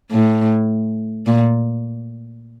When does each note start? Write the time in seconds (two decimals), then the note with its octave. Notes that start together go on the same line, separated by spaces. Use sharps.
0.12 A2
1.26 A#2